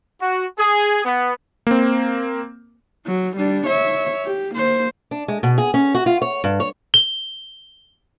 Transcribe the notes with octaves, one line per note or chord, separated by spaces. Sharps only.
F#4
G#4
B3
A#3 C4
F#3
G3 D4
C#5 E5
G4
A#3 C5
D4
G#3
B2
G#4
C#4
F#4
F4
C#5
G2
C#5
G7